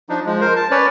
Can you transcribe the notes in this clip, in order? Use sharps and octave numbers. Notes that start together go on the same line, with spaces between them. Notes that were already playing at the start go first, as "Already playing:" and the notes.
F3 D4 D#4
F3 G#3
A#4 C5
A5
C#4 B4 C#5 D5